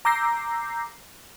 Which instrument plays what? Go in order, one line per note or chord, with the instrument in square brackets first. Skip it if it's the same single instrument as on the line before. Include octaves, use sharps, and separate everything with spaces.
[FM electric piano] A#5 D6 E6 G6 A#6 C7